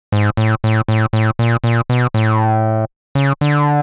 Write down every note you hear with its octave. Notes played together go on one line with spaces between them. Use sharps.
G#2
A2
A2
A2
A2
A#2
A#2
B2
A2
C#3
D3